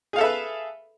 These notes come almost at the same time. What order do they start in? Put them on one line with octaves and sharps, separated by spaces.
G#4 F5 A4 E5 B4